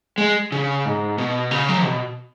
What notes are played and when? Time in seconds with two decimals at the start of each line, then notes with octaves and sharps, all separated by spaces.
0.18 G#3
0.52 C#3
0.85 G#2
1.18 B2
1.51 C#3
1.68 F#3
1.84 B2